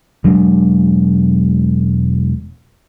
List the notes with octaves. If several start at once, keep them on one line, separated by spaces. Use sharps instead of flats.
E1 F#3 G#3 D4